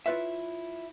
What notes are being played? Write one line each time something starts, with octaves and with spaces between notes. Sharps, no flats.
E4 F4 B4 C#5 E5